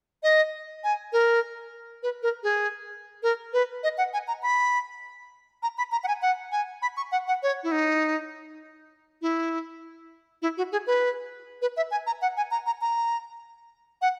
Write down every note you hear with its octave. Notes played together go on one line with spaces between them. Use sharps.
D#5
G#5
A#4
B4
A#4
G#4
A#4
B4
D#5
F#5
G#5
A#5
B5
A#5
B5
A#5
F#5
G#5
F#5
G#5
B5
C#6
F#5
F#5
C#5
E4
D#4
E4
E4
F#4
G#4
B4
B4
E5
G#5
A#5
F#5
G#5
A#5
A#5
A#5
F#5